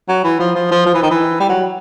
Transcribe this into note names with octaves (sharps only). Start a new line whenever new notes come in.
F#3
E3
F3
F3
F3
F3
E3
D#3
E3
G3
F#3